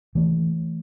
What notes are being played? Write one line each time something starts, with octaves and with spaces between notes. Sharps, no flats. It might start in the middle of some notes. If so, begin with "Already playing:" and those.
E3 A3